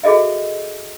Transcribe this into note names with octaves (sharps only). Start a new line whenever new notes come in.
F#4 G#4 A4 D#5 E5